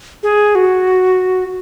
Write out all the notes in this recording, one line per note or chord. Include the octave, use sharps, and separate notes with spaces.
G#4
F#4